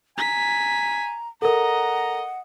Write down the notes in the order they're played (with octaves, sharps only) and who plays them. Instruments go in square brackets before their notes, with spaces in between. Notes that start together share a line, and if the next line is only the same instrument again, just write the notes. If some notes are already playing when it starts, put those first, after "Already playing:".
[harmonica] G#5 [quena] A#5 [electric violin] B6
[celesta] A4 A#4 [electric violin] D#5 [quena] F#5 [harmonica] A#5